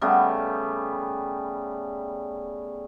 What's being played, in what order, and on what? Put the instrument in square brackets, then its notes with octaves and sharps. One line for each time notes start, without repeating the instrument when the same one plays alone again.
[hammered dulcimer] C#3 G3 A3 B3